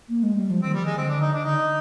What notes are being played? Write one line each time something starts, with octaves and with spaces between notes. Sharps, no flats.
A#3
G#3
G3
F3
D#3 C4
G3
D#3 G#3
D3 C4
D4
D#4
D4
D3 D#4